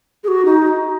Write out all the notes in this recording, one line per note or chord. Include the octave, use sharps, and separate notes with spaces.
G#4
F#4
D#4